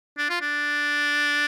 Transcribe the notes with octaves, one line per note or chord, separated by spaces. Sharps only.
D4
F4
D4